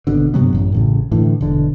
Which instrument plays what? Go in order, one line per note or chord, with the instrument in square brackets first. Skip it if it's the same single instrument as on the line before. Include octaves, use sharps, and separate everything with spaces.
[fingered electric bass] G#1 B2 D3
G2 C3 F#3 B3
A1 F#2
A1 A2 C#3
A2 D3 E3
E1 D3